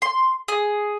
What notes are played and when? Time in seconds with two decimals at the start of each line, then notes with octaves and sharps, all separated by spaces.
0.02 C6
0.48 G#4